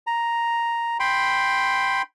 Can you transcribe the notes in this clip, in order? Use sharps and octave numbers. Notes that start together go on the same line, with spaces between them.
A#5
G5 B5 C6